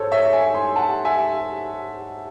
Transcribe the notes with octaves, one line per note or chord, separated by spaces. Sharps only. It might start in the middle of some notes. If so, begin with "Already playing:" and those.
Already playing: G#2 G#4 A4 C5 C#5
C#5 E5
E5 G#5
G#5 C6
F#5 A5
E5 G#5